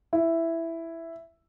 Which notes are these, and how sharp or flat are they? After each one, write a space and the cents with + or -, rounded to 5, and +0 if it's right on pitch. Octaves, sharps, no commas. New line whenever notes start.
E4 +5